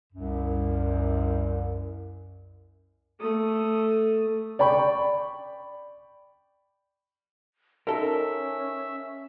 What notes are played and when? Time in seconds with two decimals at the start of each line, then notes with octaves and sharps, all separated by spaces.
0.13 C2 F#2
3.19 A3 D#6
4.59 D5 G5 B5 C#6
7.87 C#4 D#4 A4 A#4 E5